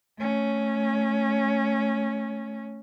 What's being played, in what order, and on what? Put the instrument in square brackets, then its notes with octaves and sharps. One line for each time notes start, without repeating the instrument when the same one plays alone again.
[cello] A3 C#4